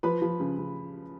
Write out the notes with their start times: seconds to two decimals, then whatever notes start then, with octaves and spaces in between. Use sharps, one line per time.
0.03 F3 B4 B5
0.22 F3
0.40 C#3
0.58 C#3